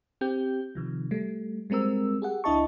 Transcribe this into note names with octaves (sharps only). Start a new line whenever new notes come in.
C4 G4 G6
C3 D#3 F3
G3 A3
G3 G#3 C4 A#4 E6
G4 G#4 F#5
C#2 D4 E4 D#5 A5 C#6